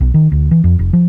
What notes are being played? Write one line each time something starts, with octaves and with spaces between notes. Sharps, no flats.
B1
D#3
D2
E3
F2
F1
F3